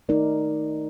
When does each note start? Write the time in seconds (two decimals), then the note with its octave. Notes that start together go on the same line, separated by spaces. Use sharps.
0.09 D#3 A3 D#4 A#4 D5